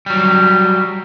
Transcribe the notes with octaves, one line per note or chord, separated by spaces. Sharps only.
F#3 G3